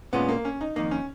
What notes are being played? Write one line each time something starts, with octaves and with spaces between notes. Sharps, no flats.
A#2 G#3 B3 C#4 F4
A#3
C#4
D#4
F2 D#3 A#3 D#4
C#4